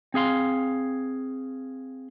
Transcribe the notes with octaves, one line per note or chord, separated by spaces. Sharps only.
C4 G#4 F5 C6